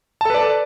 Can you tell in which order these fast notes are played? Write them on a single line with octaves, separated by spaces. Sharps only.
A5 A4 B4 D5